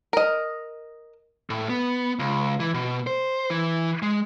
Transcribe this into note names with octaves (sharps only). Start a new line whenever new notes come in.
A#4 D#5
A2
B3
C#2
E3
B2
C5
E3
G#3